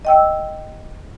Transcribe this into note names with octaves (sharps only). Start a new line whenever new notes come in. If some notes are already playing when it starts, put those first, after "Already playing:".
D#5 G5 E6